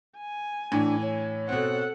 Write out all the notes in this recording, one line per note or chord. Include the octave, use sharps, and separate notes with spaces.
G#5
A2 E3 D4
C#5
B2 C4 A4 F#5